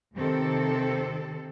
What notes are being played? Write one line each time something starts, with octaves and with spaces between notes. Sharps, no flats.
D#2 C3 D#3 C4 A4